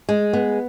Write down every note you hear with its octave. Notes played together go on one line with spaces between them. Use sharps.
G#3
B3